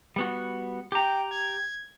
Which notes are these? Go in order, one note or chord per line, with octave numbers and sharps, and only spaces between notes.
G3 B3 F#4
G4 G5 A#5
G#6